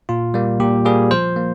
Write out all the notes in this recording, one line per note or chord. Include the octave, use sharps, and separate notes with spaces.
A#2 F4
G3 A#3
A#2 G4
G3 A#3 G#4
F3 C5
A#3